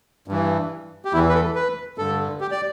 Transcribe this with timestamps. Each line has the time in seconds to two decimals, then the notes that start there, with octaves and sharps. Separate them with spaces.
0.28 G2 E3
1.05 G4
1.13 E2 E3 E4
1.29 B4
1.34 A4
1.55 B4
1.98 G2 D3 A4
2.40 G4
2.51 D5